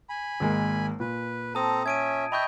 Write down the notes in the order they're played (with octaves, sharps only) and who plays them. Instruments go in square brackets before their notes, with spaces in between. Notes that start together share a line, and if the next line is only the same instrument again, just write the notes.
[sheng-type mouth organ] G#5 B5
[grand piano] G#1 G#3 A#3
[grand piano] A#2 [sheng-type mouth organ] B4
[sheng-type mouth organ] C4 A4 A#5 [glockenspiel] A5 D#6
[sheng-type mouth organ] C#4 E5 [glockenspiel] G#6 D7 D#7
[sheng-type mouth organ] D#5 E5 G5 [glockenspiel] B5 C#6 G6